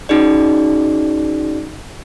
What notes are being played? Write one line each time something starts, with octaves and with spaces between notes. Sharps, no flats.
C#4 D#4 F#4 G#4 D5